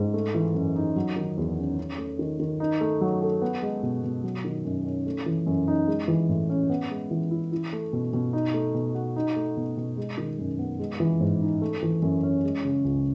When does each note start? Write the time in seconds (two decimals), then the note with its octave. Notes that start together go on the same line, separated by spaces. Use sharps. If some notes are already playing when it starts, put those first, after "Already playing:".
Already playing: G#2
0.14 A3
0.34 E3
0.55 F#2
0.76 D#4
0.96 F#3
1.16 D#3
1.37 E2
1.58 C#4
1.78 C#4
1.98 A3
2.19 D#3
2.40 D#3
2.60 D#4
2.81 A3
3.01 F#3
3.21 A4
3.42 B3
3.62 G#3
3.83 B2
4.04 B2
4.24 F#3
4.45 D#3
4.65 F#2
4.85 C#4
5.06 A3
5.26 E3
5.47 F#2
5.68 D#4
5.88 G#3
6.08 E3
6.29 A2
6.50 C#4
6.70 B3
6.91 G#3
7.11 E3
7.31 E4
7.52 E4
7.73 A3
7.93 B2
8.13 B2
8.33 D#4
8.54 A3
8.74 B2
8.95 F#4
9.16 D#4
9.36 A3
9.57 B2
9.77 B2
9.97 G#3
10.18 D#3
10.39 F#2
10.59 B3
10.79 G#3
11.00 E3
11.21 G#2
11.41 D#4
11.62 A3
11.83 E3
12.02 F#2
12.23 C#4
12.44 G#3
12.64 C#3
12.84 C#2